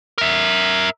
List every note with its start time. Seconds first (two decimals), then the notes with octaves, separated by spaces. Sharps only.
0.18 A#4 E5